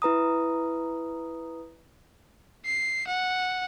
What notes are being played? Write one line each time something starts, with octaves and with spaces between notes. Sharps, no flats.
E4 B4 A#5 D#6
C7
F#5